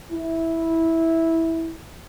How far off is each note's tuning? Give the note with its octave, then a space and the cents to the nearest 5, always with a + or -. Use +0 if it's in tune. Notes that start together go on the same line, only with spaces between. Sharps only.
E4 -10